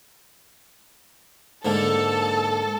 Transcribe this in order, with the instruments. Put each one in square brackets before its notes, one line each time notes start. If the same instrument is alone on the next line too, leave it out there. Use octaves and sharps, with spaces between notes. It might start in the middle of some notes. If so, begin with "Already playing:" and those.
[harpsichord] G#2 D3 A#3 [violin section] A4 A5